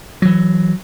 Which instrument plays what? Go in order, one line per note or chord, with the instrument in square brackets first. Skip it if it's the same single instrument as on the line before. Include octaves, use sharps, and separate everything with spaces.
[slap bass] E3 F#3